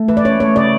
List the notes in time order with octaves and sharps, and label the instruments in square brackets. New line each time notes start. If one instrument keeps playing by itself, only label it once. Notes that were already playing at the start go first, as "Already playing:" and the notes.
Already playing: [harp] A3
[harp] E3 [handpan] B4
[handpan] D5
[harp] C#4 [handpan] C#5
[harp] A3 [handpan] C#5
[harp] C#3 [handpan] D5